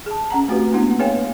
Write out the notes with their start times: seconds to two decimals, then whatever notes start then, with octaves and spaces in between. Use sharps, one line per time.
0.06 G#4 A5
0.31 C#4 F#5 A#5
0.48 A3 C4 F#4 G4 B4
0.73 A#3 B3 D4 E4 F#5
0.99 G#4 B4 C#5 F5 G5 G#5